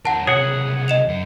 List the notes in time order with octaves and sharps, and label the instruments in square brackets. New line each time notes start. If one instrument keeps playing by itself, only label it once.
[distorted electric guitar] E2 A#4 [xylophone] F#5 A5
[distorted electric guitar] C#2 C3 [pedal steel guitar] G#4 F#5 [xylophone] C#5
[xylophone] D#5 E7 F7
[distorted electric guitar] F#2 F#5